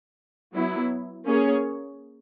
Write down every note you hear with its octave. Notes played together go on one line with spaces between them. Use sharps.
F#3 B3 E4
A#3 C#4 G#4 C#5